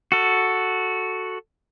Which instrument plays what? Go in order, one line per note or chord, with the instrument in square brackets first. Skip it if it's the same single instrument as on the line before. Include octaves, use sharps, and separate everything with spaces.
[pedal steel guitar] F#4 A4